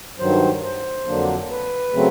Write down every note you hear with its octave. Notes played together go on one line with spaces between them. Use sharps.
G2 D#3 F#3 C5
C5
F2 D3 F#3 A#3 D4
B4
C#3 F#3 A3 C4